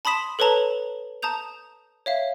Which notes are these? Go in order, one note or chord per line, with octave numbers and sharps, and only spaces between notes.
A5 B5 C6 D#6 B6 E7
A4 B4 C#5 A5 A#5
A5 A#5 D#6 G6 F7
C#5 E5 F5